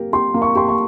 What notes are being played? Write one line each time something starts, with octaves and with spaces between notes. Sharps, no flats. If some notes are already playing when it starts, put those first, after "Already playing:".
Already playing: A#3 G4 A#4
G4 C6
A#3
C#6
G4 C6
C#6